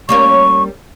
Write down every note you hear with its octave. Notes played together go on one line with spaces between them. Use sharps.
G3 A#3 C#4 C#6